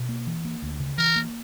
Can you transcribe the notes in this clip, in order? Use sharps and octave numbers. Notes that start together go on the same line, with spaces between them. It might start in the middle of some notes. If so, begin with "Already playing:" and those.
Already playing: B2
A#3
E3
A#3
D2
C#3
E3 A#4
A#3